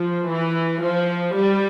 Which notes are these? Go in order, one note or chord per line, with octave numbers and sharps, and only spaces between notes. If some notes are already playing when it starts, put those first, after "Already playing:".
Already playing: F3
E3
F3
G3